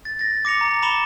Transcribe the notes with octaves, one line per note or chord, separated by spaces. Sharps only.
A6
A6 A#6
D6 A#6 C#7 F7
A#5
A#5 B5 D6 E7 F7 G7